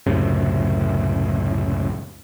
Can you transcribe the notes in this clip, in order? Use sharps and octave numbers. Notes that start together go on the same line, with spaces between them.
C#2 F#2 A2 C3